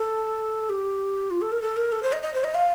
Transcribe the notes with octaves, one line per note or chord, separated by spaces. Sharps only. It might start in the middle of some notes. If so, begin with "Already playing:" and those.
Already playing: A4
G4
F4
A4
A#4
A4
A#4
A4
C5
D#5
D#5
C5
D#5
F5